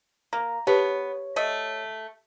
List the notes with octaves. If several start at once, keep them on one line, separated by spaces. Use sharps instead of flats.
A#3 A#5
B3 G4 B4 C#5 A5
A3 D#5